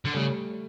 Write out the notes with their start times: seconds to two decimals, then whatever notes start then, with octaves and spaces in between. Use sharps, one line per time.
0.05 D3
0.14 C#3 G3 A3